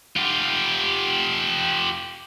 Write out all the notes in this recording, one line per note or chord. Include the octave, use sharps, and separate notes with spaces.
F4 G4